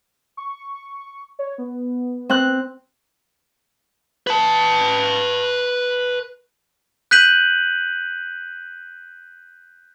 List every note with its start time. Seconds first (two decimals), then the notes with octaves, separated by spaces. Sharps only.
0.37 C#6
1.39 C#5
1.58 B3
2.29 C4 F#6
4.27 B4 A5
7.11 F#6 G6 B6 D#7 F#7